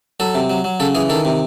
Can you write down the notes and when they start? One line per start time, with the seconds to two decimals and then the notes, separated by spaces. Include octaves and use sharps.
0.20 F#3 A4
0.35 C3
0.50 F#3
0.64 F#3
0.80 C#3 A4
0.95 E3 G#4
1.09 D#3 A4
1.25 C3